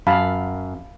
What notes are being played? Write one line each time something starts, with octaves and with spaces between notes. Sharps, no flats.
F#2 F5 A5 B5